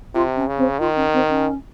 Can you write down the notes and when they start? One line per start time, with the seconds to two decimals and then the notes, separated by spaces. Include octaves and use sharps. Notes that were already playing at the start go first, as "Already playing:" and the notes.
0.14 C3 F4
0.36 C#4
0.47 C#3
0.57 C4
0.79 D#3 F4
0.96 C#4
1.13 C4
1.29 C#4